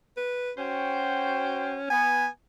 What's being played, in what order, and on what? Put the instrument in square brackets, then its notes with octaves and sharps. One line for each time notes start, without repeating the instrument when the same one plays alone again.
[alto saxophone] B4
[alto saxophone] C#4 [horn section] F#4 C5 G5
[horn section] B3 [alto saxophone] G#5